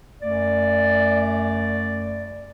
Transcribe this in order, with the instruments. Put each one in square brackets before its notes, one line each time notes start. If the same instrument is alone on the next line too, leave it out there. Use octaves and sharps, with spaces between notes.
[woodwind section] F#2 A3 D5